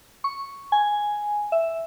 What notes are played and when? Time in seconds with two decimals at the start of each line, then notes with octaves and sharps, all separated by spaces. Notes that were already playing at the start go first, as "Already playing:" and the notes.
0.24 C#6
0.72 G#5
1.52 E5